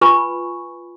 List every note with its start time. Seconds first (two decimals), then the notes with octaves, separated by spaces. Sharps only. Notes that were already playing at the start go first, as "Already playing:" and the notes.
0.01 F4 B4 G#5 B5 C#6